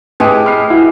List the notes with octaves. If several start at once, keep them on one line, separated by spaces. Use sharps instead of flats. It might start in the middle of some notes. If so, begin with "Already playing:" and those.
A2 G#3 G4 G#4 B4 G5 A5
B5 F6 C7
E4 F#4